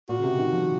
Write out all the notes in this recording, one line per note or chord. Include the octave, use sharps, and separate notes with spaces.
A#2 F#4
C#3
C3
D#3
F3